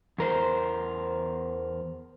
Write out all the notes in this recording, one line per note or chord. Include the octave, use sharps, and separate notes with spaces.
E2 A#4 C5